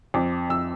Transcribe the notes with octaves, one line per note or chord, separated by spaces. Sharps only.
F2 D6
F2 E6